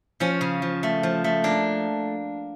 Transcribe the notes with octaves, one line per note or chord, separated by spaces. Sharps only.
F3 C#4
C#3
F3
A3
F3
A3
A#3 D4